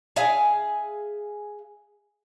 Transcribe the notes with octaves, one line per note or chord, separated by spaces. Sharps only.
G#4 E5 F5 G#5